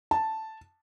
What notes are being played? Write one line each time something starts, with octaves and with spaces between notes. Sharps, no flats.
A5